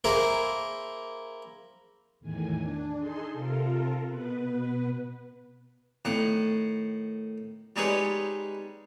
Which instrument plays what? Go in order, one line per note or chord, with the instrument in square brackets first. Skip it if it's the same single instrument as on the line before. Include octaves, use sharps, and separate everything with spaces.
[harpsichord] A#3 E4 G#4 A#4 C5
[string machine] E2 A2 D#3 G#5
D4
D#4 G#4 A4 C6
C3 F4 A4 A#4
B2 B3 B4
[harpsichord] A2 D#3 F#5
G3 G#3 D#4 G#4 B4 C#5